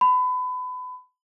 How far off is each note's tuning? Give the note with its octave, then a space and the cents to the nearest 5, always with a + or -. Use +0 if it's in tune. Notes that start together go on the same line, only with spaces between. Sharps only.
B5 +30